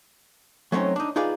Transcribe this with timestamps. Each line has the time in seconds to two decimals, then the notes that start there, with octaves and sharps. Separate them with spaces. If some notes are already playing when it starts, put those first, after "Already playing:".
0.72 F#3 A3 C4 C#4 D#4
0.96 D4 D#4
1.16 D#4 F4 G#4 B4 D5 F5